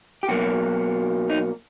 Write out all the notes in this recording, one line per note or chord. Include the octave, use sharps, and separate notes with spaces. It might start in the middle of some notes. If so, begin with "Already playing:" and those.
G4
B2 F#3 A#3 F#4
D#4